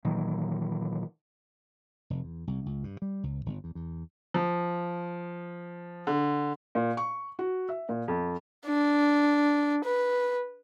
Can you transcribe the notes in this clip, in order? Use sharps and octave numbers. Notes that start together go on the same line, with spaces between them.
A#2 D#3 E3 F#3
F1
E2
C2
C#2
G2
G3
C#2
G1
E2
E2
F3
D3
A#2
C#6
F#4
E5
A#2
F2
D4
B4